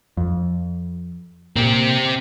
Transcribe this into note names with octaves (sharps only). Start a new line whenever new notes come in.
F2
A#2 C4 G4